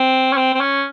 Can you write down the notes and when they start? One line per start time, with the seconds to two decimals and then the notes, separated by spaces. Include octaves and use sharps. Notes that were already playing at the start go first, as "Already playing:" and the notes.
Already playing: C4
0.33 C#4
0.37 C4
0.54 C4
0.60 C#4